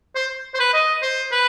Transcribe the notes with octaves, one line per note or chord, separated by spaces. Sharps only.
C5
C5
B4
D#5
C5
B4